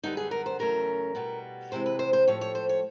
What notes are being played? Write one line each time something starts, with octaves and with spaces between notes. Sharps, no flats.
F#2 D3 G3 B3 D#4
G#4
A#4
C5
E2 C#3 F#3 A3 C#4 A#4
B2 G3 B3
D2 C3 E3 G#3 C5
B4
C5
C5
A2 F3 A3 C#5
C#5
C5
C#5